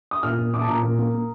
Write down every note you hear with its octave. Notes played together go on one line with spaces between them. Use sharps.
D#6
A#2 F6
A#2
A#2 D6
A5
A#2 A#5
A#2
A#3
A#3